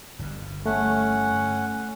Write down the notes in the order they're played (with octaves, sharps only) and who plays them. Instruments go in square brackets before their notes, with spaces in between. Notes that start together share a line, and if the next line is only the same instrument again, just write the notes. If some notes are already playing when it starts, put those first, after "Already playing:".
[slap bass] G1 G2
[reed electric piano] A3 [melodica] C#4 F#5